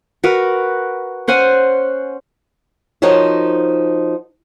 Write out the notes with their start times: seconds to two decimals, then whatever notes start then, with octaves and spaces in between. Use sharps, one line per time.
0.24 F#4 A#4 B4
1.28 C#4 C5 F#5 G#5
3.02 F3 D#4 F#4 A#4 C5 C#5